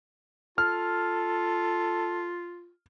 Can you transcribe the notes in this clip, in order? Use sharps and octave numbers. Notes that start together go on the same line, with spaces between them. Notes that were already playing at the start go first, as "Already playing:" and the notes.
F4 A4 F6